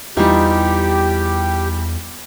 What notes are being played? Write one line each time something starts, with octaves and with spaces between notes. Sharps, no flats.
E2 E3 G3 D#4 F4 G4 C#6